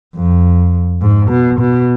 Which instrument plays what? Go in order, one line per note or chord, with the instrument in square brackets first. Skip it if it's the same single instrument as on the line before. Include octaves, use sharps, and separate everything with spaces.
[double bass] F2
G#2
B2
B2